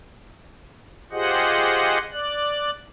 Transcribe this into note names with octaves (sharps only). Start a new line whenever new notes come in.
F4 G4 G#4 C5 D#5 F#5
D5 F#6